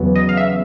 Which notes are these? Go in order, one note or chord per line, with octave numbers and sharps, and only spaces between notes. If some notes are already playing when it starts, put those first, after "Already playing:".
Already playing: E2 C#3 F#3 B3
D#5
F5
E5